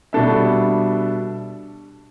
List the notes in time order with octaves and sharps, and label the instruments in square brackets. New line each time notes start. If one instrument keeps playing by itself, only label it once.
[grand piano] B2 G3 D4 A4 E5